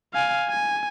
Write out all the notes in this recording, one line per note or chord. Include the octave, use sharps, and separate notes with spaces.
F5 G#5
G#5